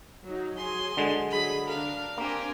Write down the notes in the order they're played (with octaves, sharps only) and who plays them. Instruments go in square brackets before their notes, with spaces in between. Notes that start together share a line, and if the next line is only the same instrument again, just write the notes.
[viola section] F#3 D#4
[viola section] F#3 G#4 G#5 [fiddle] C6
[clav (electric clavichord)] D3 G#3
[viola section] F#3 G#4 [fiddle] B5
[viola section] D4 A#4 [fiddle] F5
[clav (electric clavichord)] A#3 [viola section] C4 D4 G#5 [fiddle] G4 A#4